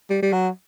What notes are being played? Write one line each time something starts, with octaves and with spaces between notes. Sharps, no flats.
G3
G3
F#3